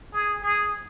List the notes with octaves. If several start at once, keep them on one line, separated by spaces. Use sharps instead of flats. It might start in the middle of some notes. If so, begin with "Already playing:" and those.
G#4
G#4